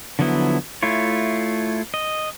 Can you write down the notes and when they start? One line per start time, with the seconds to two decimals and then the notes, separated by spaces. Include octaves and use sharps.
0.19 D3 F3 F#3 B3 E4
0.83 A3 E4 F4 C#5
1.94 D#5